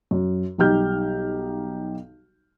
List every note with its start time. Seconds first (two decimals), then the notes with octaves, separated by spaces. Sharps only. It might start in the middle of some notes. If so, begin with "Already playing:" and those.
0.11 F#2
0.58 B1 G3 D#4 G4 F6 G6